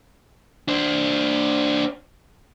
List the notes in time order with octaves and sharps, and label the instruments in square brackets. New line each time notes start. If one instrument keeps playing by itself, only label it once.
[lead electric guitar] D4 C5